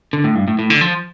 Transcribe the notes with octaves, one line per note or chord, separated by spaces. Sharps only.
D3
A2
G2
A2
A2
D3
F3